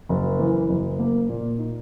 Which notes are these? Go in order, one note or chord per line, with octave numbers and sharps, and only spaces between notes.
F#1
E3
F#1
A#3
A#2
D#4